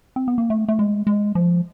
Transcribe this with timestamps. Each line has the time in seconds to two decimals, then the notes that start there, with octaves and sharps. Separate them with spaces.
0.16 C4
0.28 B3
0.38 A#3
0.50 A3
0.68 A3
0.79 G#3
1.07 G#3
1.35 F3